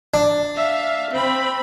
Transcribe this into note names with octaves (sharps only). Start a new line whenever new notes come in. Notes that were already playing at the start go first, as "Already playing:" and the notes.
D4
E5 F5
C4 B5